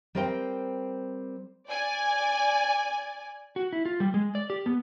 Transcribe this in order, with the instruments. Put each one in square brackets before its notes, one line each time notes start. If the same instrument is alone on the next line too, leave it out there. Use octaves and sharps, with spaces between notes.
[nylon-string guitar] G3 C4 A#4 C5 F5 G5
[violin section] D5 G#5
[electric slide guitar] F#4
E4
F4
G3
G#3
D5
G4
B3